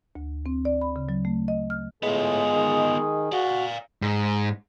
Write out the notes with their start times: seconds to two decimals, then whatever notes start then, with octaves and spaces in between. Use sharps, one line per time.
0.15 D2
0.46 C4
0.65 D5
0.81 B5
0.96 C#3
1.09 F#3
1.25 A3
1.48 D#5
1.70 F6
2.03 A2 G#3 B3 F4 G#4
2.53 D#3
3.32 F#4 D5 F5
4.02 G#2